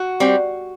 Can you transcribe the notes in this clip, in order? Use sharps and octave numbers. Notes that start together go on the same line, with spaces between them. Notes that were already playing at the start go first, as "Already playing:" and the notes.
Already playing: F#4
G3 C4